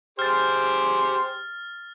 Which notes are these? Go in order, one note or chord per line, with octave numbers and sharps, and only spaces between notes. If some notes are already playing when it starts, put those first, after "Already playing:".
G4 G#4 C5 F6 A6